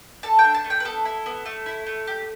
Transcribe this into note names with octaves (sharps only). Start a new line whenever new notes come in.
A4 A5
G5
D4
A5
A3
G5
B4
B3 A4
E4
B3
A3
E4
A3
G4